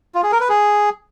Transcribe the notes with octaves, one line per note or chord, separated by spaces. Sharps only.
F4
G#4
A#4
B4
G#4